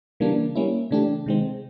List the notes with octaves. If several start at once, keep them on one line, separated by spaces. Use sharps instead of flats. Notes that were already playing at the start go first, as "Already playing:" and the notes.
C#3 E3 G3 A#3 D4
G3 A#3 C#4 E4
C#3 E3 A3 D4 G4
C3 D#3 G#3 C4